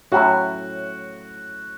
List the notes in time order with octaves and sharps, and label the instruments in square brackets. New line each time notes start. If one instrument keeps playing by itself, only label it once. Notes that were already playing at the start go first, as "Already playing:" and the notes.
[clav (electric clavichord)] A2 F#3 C#4 E4 [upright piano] F#4